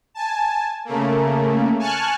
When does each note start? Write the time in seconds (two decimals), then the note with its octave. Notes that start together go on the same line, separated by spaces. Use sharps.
0.14 G#5 A5
0.85 C#3 A3 A#3
1.79 G#5 A5 C#6 F6 F#6